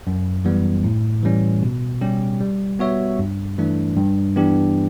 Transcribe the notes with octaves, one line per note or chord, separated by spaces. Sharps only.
F#2
E3 G3 B3
A2
E3 G3 C#4
B2
G3 C#4 G4
G3
B3 F#4 C#5 E5
G2
E3 A3 D4
G2
E3 B3 D4 G4